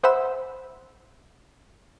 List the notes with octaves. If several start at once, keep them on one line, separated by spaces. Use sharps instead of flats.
G#4 C5 E5 F#5 B5 E6